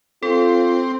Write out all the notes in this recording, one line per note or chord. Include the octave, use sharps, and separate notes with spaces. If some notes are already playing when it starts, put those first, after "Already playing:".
C4 F4 A4